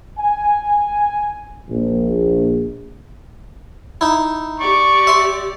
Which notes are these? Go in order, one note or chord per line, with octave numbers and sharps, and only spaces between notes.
G#5
A#1
D#4 E4
G4 D5 C#6
E5 C6